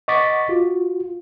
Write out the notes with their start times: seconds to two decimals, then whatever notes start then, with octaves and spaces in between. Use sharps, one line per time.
0.08 D#5 F#5 C#6 D6 A6 B6
0.49 F4 F#4